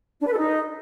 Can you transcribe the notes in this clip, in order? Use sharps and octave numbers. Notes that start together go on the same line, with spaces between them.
D4
B4
A4
D#4